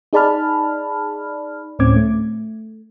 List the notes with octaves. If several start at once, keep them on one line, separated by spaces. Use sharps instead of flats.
D#4 G#4 D5 A5 B5 F6
D2 A2 C4 C#4 D6 G#6
A3